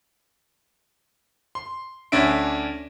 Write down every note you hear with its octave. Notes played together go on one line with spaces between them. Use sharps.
C6
D2 C#4 D4 E5 D7